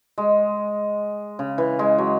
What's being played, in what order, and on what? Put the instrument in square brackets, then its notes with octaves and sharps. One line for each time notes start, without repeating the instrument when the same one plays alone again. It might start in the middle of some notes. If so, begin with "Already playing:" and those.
[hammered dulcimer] G#3
C#3
E3
G#3
F#3